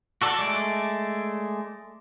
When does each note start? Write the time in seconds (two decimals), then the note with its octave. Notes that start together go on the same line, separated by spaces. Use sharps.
0.22 F#4 A4 D5
0.39 G#3 A3 D5